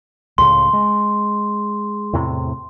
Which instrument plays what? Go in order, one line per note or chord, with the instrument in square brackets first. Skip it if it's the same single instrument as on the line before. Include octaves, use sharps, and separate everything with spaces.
[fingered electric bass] C#2 A2 C#3 [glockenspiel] C6
[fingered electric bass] G#3
E2 A2 C3